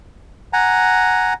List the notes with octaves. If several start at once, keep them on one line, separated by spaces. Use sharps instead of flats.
F#5 G#5 A#5